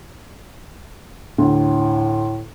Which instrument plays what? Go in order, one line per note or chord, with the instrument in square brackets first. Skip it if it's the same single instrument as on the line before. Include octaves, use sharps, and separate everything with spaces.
[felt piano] D2 [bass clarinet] A2